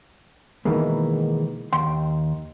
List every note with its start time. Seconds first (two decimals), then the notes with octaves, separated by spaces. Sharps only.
0.65 B2 D#3 E3 G#3 A#3
1.73 D#2 G5 C6